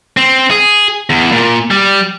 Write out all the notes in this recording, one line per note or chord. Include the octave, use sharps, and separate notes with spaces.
C4
G#4
E2
A#2
G3